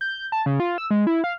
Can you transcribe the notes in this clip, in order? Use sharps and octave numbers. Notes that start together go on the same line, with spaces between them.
G6
A5
C#3
F4
E6
G#3
E4
F5